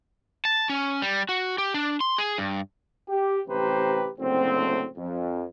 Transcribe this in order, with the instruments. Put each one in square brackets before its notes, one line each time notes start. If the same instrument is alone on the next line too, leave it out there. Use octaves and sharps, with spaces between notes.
[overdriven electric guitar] A5
C#4
G3
F#4
G4
D4
C6
G#4
G2
[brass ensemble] G4
A1 C3 G4 B4 C5 A#5
F#1 D2 A2 C4
F2